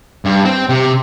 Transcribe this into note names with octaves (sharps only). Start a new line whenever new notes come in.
G2
C4
C3